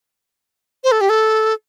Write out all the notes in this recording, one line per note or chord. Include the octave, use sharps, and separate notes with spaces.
C5
A4
G4
A4